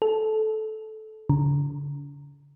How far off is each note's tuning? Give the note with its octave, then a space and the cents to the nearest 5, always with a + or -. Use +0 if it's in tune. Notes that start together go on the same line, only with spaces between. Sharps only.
A4 -15
D3 -45